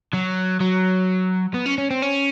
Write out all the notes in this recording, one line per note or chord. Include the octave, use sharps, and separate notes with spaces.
F#3
F#3
B3
C#4
C#4
C4
C#4